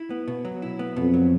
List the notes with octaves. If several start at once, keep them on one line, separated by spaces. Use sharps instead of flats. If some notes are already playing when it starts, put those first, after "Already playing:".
Already playing: E4
B3
B2
F#3
E4
B3
F2 B2
F#3